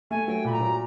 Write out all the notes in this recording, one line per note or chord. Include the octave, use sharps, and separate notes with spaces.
A3 G#5
F#3 G5
A#2 B5
A#5
F#3